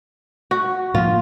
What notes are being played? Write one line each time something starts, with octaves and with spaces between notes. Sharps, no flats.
F#4
A2 F3 A#3 F4